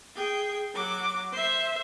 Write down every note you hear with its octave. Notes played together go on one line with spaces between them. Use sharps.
G#4 G5
F#3 D6
C5 E5